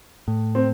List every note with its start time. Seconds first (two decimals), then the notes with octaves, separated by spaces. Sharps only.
0.28 A2
0.55 C4